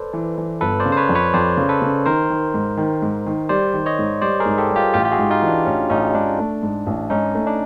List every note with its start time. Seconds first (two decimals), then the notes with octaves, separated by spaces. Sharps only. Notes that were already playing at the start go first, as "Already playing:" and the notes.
Already playing: A4 B4 C5 D5
0.13 E3
0.38 E3
0.61 G1 A4 B4
0.80 C5 D5
0.85 C#3
0.92 C5
0.97 B4 C#5
1.09 F2
1.15 B4 C#5
1.34 F2 C5 D5
1.57 C#3
1.69 A4 B4
1.82 C#3
2.05 D#3 A#4 C5
2.30 D#3
2.54 G#2
2.77 D#3
3.02 G#2
3.26 D#3
3.49 G3 C5 D5
3.74 D#3
3.86 C#5 D#5
3.99 G#2
4.21 G3 C5 D5
4.40 G#4 A#4
4.45 G#2
4.58 G4 A4
4.70 G3
4.76 F4 G4
4.94 A1 F4 G4
5.05 G4
5.12 F#4 G#4
5.18 G#2
5.30 D#4 F4
5.42 E3
5.48 D4
5.66 A1 C#4
5.90 A1 C#4 D#4
6.14 G#2 D4
6.39 A3
6.63 G#2
6.86 A1
7.10 G#2 C#4 D#4
7.35 A3
7.47 D4